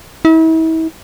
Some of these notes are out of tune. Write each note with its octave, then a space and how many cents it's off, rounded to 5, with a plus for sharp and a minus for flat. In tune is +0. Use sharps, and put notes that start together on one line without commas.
E4 -40